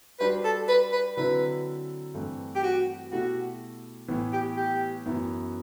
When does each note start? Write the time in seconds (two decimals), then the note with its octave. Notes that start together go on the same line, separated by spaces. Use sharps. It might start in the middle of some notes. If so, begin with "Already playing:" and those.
0.20 G3 D4 F#4 B4 C5
0.45 A4
0.68 B4
0.92 B4
1.16 D3 F#3 C4 E4 B4
2.14 G2 E3 A3 C4 E4
2.55 G4
2.63 F#4
3.11 B2 A3 E4 F#4 G4
4.08 A2 E3 B3 E4
4.32 G4
4.56 G4
5.06 F#2 E3 B3 E4